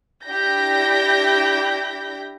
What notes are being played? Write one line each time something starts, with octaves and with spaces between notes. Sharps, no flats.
D4 E4 G4 G6 A#6 B6